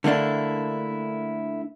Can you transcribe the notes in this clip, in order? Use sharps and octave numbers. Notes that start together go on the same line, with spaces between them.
D3 A3 A#3 D4 E4